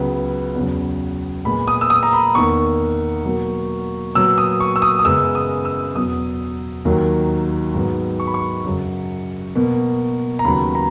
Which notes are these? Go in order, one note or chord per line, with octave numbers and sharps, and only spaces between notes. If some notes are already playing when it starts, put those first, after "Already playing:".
Already playing: C#2 C#3 F#3 B3
E2 C#3 F#3
A#2 G#3 B3 B5
D#6
E6
D#6
A#5
B5
E2 D#3 A#3 C#6
B2 F#3 A#3
A#2 F#3 B3 E6
D#6
C#6
E6
D#6
D#6
F#2 C#3 G#3 B3 E6
D#6
E6
E2 B2 F#3 D#6
D#2 D#3 F#3 A#3
G#2 F#3 B3
C#6
B5
C#6
F#2 C#3 F#3
B2 A#3
A#5
D#2 C#3 F#3 B3 B5
A#5